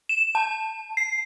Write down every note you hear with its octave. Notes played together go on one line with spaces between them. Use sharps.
E7
A5
C7